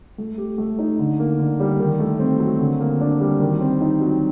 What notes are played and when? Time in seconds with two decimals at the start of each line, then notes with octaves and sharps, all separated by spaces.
0.18 A3
0.38 G4
0.58 A3
0.79 D#4
0.99 D3
1.20 A#3
1.39 D3
1.60 G3
1.80 D#3
1.99 A3
2.20 C4
2.40 F#3
2.59 D3
2.80 A#3
3.01 D4
3.20 G3
3.41 D#3
3.61 C4
3.81 D#4
4.01 F#3